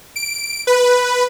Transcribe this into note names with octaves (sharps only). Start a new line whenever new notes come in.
D7
B4